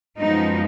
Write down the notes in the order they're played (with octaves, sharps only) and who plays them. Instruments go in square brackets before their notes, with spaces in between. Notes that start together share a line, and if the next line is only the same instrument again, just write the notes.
[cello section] F#2 F3 G#3 B3 D#4